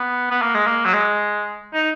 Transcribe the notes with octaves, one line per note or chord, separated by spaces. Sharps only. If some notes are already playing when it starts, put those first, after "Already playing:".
Already playing: B3
B3
A#3
G#3
A#3
F#3
G#3
D#4